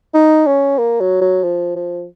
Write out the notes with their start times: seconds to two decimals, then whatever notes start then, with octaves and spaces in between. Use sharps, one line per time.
0.14 D#4
0.46 C#4
0.79 A#3
1.00 F#3
1.21 F#3
1.43 F3
1.76 F3